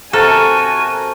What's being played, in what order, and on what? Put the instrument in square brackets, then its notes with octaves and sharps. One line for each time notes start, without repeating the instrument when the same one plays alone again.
[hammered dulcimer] C3 A5 C#6 [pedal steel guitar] F#4 A#4 [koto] A4 [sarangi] G#5